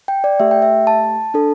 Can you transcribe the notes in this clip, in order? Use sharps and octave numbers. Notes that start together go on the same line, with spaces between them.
G5
D5
A3 G4 E5
G5
E5
A5
D4 A4